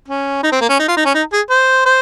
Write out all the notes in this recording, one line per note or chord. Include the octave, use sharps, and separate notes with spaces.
C#4
D#4
C4
A#3
C#4
D#4
F4
D#4
C#4
D#4
G#4
C5
C5